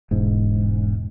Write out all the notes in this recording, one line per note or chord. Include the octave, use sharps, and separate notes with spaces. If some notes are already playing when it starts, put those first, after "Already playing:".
E1 G#2